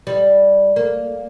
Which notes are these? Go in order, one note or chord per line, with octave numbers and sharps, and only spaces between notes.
G3
A#3